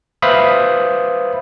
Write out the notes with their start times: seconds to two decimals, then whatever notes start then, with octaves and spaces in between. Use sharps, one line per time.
0.22 B4 C5 E5 F5 B5 D#6